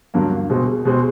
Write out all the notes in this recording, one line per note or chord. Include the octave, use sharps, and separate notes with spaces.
G2 D3 F#3 A#3
B2 G#3 C4
B2 G#3 C4